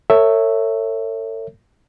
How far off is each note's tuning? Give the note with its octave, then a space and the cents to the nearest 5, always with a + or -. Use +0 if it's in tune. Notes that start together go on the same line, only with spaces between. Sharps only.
A4 +40 C#5 -5 E5 +0